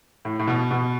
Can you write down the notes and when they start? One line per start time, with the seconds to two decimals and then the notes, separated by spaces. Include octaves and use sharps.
0.25 A2
0.39 A2
0.47 B2
0.71 B2